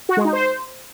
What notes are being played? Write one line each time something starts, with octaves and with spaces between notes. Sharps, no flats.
F#4
G#3
D#4
C5